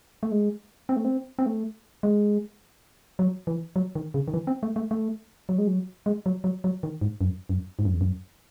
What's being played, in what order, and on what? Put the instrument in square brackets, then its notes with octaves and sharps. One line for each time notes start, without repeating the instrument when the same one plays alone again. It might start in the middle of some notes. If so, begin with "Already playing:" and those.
[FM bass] A3
G#3
C4
A3
C4
C4
A3
G#3
F#3
E3
F#3
D#3
C#3
D#3
E3
C4
A3
A3
A3
F#3
G#3
F#3
G#3
F#3
F#3
F#3
D#3
G#2
F#2
F#2
G#2
F#2
E2
F#2